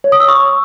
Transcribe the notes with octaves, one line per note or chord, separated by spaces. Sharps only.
C#5
D#6
E6
C#6